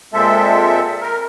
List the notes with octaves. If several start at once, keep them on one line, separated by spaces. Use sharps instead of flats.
A#2 G#3 C4 A4 E5
A#4